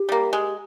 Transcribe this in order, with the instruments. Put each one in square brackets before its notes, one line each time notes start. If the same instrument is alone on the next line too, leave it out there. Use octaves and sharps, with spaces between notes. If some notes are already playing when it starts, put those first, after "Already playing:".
Already playing: [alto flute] G4
[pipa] G3 A#3
G#3